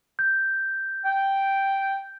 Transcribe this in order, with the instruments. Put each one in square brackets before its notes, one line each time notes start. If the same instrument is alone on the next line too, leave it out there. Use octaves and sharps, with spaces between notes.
[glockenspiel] G6
[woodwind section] G5